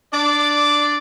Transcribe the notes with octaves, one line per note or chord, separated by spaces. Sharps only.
D4 D5